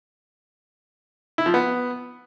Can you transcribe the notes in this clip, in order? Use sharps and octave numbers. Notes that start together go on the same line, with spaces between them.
E4
F3
B3